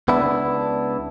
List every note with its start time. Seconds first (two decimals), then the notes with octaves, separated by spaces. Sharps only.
0.08 C#2 B3 D4 E4